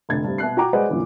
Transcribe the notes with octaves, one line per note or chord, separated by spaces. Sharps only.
F1 D3 G#6 A6
G2 C3
B2 E5 F#6 C7
F#4 G5 A#5 D6
G#3 B4 C5 D5 D#5 F#5
F#2 A#2 D3 E3